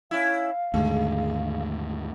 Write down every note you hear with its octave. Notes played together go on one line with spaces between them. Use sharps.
C#4 E4 F5
D#2 G#2 D3 G#3 A3